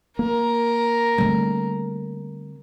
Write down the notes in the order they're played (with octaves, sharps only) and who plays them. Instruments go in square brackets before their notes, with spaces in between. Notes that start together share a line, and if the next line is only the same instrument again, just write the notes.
[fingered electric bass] A#3 [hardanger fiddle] A#4
[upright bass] D3 C4 [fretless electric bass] G3 A3